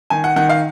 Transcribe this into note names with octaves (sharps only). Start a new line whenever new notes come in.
D#3 G#5
F#5
D#3 F#5
F5